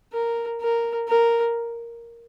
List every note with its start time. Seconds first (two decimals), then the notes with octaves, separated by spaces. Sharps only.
0.13 A#4
0.61 A#4
1.08 A#4